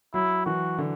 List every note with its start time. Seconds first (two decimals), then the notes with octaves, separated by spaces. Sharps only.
0.14 F#3 E4
0.46 E3 F#4
0.78 D3